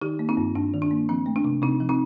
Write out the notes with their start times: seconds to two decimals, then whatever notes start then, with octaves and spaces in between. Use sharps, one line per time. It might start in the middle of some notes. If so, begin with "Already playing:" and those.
0.02 D#3 D#4 G4
0.19 A#3
0.29 C4 D#4
0.37 G2
0.55 G2 D4
0.74 D#3
0.82 D4
0.91 A#3
1.09 F3 C4
1.26 A3
1.36 D4
1.45 C3
1.62 C3 C4 D#4
1.80 F3
1.89 C4 D#4